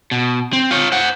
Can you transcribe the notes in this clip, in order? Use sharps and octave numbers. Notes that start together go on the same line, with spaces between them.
B2
C4
F4 C#5
C5 F#5